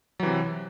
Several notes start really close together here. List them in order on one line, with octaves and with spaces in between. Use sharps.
F#3 E3 C3